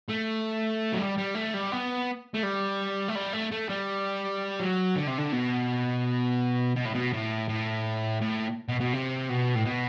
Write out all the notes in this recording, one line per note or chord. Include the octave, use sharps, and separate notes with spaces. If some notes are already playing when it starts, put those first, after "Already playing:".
A3
F#3
G3
G3
A3
G3
B3
A3
G3
A3
G3
A3
A3
G3
F#3
D3
C3
D3
B2
B2
A2
B2
A2
A2
A2
B2
B2
C3
B2
A2
B2